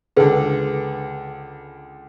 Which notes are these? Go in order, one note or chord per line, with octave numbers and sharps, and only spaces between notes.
C#2 D3 G#4 A4 B4